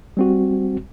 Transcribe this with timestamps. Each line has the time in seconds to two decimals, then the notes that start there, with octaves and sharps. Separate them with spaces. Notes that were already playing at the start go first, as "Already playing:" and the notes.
0.17 G3 C4 F#4